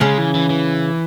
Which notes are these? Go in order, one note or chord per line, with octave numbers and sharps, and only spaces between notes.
C#3 G#3 C#4
E3
E3
E3